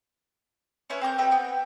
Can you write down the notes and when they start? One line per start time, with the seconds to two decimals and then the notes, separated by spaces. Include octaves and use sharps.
0.90 C#4 E4 B4 C#5
1.01 C4 A#4 D6 G6
1.18 C4 D#4 G4 B4
1.31 B3 G5